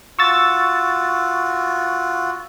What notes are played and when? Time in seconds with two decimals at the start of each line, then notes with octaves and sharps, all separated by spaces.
0.19 F4 F#4 C#6 E6 A6